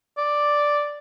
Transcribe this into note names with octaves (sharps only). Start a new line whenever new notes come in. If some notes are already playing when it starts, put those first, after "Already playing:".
D5